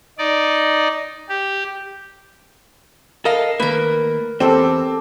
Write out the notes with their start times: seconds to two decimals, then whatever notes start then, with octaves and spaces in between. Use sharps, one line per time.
0.18 D#4 D5
1.29 G4
3.25 A4 A#4 D#5 F5
3.60 D#3 A3 A#3 A#4 B4
4.40 E2 C4 G4 A4 D6